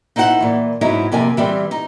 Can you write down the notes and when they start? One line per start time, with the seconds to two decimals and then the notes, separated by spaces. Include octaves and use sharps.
0.16 D#4 E4 C5 F5 F#5
0.40 A#2 E3
0.81 G#2 F#3 B3 D#4 E4
1.12 F2 C3 A#3 G#5
1.37 E3 G3 C4
1.71 D#4